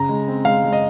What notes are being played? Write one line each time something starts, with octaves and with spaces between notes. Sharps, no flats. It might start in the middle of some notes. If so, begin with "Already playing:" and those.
Already playing: C#3 A#5
G#3
C4
G#3 F5
G#3
D#5